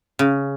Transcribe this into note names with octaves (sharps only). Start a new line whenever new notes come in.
C#3